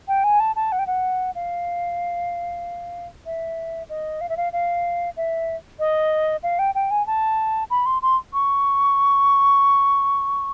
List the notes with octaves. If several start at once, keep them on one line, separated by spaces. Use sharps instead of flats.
G5
G#5
A5
A5
F#5
G5
F#5
F5
E5
D#5
F5
E5
F5
F5
E5
D#5
F5
G5
G5
G#5
A5
B5
C6
C6
C#6